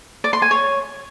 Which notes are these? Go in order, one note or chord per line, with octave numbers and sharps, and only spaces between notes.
D5
C6
G#5
C#5